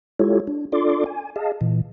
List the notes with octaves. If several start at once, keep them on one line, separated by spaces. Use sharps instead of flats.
G#3 E4 F4 G4 A4 C#5
D4
D4 F4 A4 D5 C6 D6
G#5
G#4 D#5 F5 A5
A#2 E3